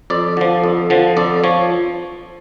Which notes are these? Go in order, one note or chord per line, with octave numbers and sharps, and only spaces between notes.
F2 D5
D3 F3
F2
D3 F3
F2 D5
F3 C#5